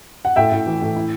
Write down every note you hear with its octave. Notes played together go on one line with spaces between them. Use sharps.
F#5
A2 E5 G5
A2
E3
A2
E4